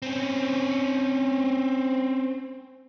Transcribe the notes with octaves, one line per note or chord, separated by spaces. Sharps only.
C4 C#4